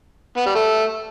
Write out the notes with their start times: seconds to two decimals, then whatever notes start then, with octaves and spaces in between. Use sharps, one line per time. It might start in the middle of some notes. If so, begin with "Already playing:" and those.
0.37 B3
0.46 G3
0.55 A3